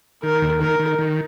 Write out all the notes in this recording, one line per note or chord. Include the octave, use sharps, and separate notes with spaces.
D#3 A#4
D#2
D#3 A#4
D#3
D#3